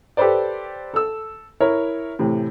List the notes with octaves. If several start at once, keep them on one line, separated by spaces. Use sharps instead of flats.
G4 A4 B4 C5 D5
A4 E6
E4 A#4 C#5
A2 C3 E3